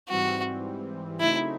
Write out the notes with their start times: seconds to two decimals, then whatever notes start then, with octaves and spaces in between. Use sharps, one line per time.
0.09 G#2 E3 G3 C4 F#4
1.20 C#3 F#3 A3 C4 D#4 E4